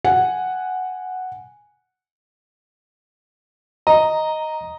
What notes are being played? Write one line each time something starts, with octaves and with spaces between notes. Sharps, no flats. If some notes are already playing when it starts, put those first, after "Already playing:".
F#5 G#5
D#5 A#5